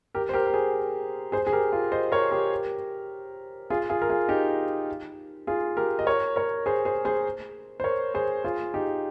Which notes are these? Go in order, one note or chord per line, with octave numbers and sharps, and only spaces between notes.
G4 A#4
C5
G4 A#4
A#4
G#4 C5
G#4 C5
G#4
G4 A#4
F4
C5 D#5
A#4 C#5
G4 A#4
F4 G#4
F4 G#4
A#4
F4 G#4
D#4 G4
F4 G#4
G4 A#4
D#5
A#4 C#5
A#4 C#5
G#4 C5
G#4 C5
G#4 C5
C5
A#4 C#5
G#4 C5
F4 G#4
D#4 G4